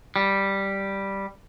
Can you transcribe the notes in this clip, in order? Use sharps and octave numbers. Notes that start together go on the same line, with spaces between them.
G3